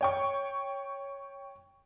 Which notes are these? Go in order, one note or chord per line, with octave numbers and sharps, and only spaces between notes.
C#5 G5 C#6